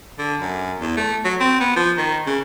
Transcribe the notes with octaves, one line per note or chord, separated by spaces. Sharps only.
D3
F#2
E2
A3
F#3
C4
B3
F3
D#3
C#3